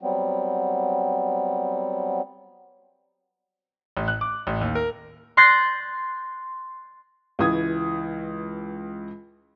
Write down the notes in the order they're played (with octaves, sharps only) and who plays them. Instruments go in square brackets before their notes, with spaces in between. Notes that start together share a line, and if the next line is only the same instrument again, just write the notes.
[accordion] F#3 G3 B3 C4
[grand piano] A1
F#6
D6
A1
D#2
A#4
[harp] C6 F#6 G6 A6 A#6 C7
[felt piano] C#2 E3 D#6 G#6